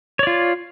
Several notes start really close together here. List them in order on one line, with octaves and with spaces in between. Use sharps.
C#5 D5 F4